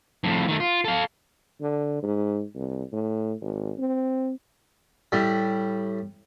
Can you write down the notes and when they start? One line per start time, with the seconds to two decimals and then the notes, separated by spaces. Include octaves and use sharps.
0.24 F2 A2
0.48 D#3 A3
0.60 F4
0.85 A4 F5
1.61 D3
2.03 G#2
2.55 C2
2.93 A2
3.42 G#1
3.79 C4
5.12 A2 G3